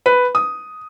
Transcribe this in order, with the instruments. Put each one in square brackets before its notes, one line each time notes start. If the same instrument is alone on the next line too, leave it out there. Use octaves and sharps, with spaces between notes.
[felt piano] B4
D#6